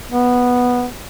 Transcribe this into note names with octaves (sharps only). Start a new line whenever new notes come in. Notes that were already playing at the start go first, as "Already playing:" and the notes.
B3